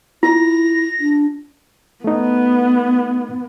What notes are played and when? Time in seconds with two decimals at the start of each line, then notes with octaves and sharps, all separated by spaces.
0.23 E4 F4 A#6
1.00 D4
2.04 A3 B3 D#4